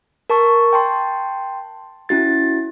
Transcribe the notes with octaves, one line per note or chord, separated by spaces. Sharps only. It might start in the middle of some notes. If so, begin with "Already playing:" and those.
A#4 A5 C#6
G5 A5 C6
C#4 E4 F#4 A6